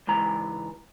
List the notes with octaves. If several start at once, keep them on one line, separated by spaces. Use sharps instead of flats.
C#2 G#2 E3 A#5